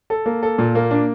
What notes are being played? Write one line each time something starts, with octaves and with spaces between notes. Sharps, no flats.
A4
A#3
A4
A#2
A#3
D4